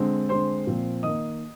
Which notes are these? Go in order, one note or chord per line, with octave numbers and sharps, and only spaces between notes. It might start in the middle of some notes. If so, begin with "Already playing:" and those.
Already playing: D3 G#3 C4
D3 G#3 C4 C5 C6
A#2 F3 C4
D#3 A#3 D#5 D#6